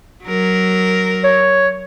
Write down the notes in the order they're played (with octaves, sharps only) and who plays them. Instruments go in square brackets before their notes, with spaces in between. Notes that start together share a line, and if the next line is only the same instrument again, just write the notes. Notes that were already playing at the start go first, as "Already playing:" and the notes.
[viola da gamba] F#3 A#4
[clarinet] C#5